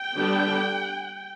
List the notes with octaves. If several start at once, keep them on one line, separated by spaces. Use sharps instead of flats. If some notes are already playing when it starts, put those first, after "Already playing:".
Already playing: G5
D3 G3 B3 D4